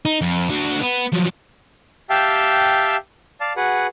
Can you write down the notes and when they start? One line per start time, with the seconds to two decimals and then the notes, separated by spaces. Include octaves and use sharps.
0.05 D#4
0.21 F2
0.50 D3 F#4
0.80 B3
1.12 F3 F#3
2.10 G4 E5 F5 G5 A5
3.41 D5 F5 A5
3.56 F#4 G#4 B4 F#5